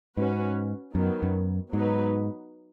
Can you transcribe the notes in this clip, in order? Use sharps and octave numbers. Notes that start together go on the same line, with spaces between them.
G#2 C#4 F#4 B4
F#2 D#3 F#3 B3
F#2
G#2 F#3 B3 D#4 B4